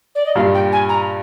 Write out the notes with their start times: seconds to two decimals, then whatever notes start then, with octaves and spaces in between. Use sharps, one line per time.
0.15 D5
0.25 D#5
0.35 G2 A#2 F5
0.54 G5
0.72 G#5
0.89 A#5